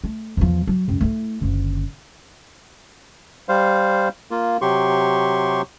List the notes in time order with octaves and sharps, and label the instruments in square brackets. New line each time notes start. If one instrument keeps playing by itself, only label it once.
[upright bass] A3
E2 F3
F#3
C#2 F#2
A3 E4
F#1 D3
[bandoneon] G3 C5 F5
A#3 F4
C3 F#3 G4 C6 C#6